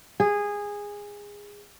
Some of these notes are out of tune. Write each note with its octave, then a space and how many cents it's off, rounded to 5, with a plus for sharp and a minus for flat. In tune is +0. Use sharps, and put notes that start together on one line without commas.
G#4 -15